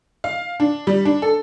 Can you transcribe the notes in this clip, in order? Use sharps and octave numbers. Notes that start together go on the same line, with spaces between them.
F5
D4
G3
D4
A4